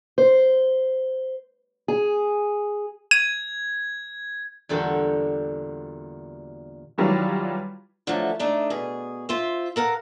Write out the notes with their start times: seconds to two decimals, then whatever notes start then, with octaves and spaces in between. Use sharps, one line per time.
0.18 C5
1.88 G#4
3.11 G#6 D#7
4.69 E2 A#2 D3 G3 F#4 A4
6.98 D#3 E3 F#3 G3 F4
8.07 D3 F3 F#3 A3
8.39 A3 D4 D#4
8.70 B2 G#4
9.29 F4 C5 E5
9.76 A4 A#4 F5 F#5